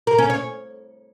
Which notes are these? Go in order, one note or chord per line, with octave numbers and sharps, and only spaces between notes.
A#4
C#4
C#5